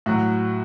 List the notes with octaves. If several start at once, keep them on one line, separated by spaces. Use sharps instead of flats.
A2 F#3 F#4